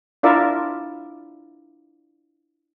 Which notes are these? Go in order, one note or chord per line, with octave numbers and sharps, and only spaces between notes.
D4 E4 F4 A#4 D5 E5